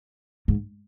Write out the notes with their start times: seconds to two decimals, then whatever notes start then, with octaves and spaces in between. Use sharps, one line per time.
0.48 G#2